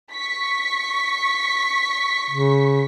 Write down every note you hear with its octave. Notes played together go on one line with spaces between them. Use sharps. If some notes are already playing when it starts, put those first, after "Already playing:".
C#6 B6
C#3